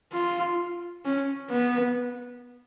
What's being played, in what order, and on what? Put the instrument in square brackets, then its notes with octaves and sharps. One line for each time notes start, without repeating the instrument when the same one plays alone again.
[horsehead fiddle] F4
C#4
B3